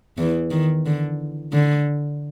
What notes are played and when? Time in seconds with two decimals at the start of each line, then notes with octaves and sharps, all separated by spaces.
0.18 E2 E3
0.51 D#3
0.86 D3
1.53 D3